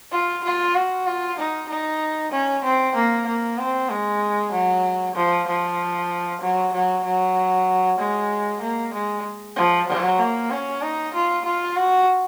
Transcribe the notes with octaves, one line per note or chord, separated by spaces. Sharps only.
F4
F4
F#4
F4
D#4
D#4
C#4
C4
A#3
A#3
C4
G#3
F#3
F3
F3
F#3
F#3
F#3
G#3
A#3
G#3
F3
F#3
A#3
C#4
D#4
F4
F4
F#4